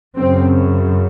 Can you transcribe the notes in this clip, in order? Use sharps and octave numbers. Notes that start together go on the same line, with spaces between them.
F#2 C#3 C4